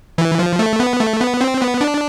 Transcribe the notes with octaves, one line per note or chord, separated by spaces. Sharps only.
E3
F3
A3
B3
A3
B3
C4
B3
D4